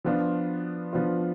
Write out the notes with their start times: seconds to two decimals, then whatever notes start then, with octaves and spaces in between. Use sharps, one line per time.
0.05 F3 B3 D4 F4
0.93 F3 B3 D4 F4